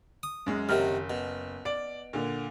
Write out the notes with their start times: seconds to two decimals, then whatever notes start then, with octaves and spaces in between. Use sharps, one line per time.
0.23 D#6
0.46 F#2 G#3
0.69 F#1 C3 D#3 F#3 F6
1.10 B2
1.65 D5 D7
2.13 A#2 D3